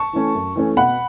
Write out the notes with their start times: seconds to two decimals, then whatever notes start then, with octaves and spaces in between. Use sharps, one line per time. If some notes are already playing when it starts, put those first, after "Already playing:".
Already playing: A5 C#6
0.13 E3 A3 C#4
0.35 F#2
0.56 E3 A3 C#4
0.76 B2 F#5 B5